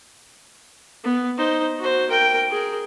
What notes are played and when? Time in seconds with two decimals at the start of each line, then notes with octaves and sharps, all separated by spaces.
1.04 B3
1.37 D#4 C5
1.79 F#4 C5
2.10 A#4 G5
2.51 G#4 A#4